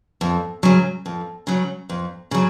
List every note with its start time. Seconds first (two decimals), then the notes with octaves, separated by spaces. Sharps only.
0.21 F2
0.63 C#3 F#3
1.06 F2
1.47 C#3 F#3
1.90 F2
2.31 C#3 F#3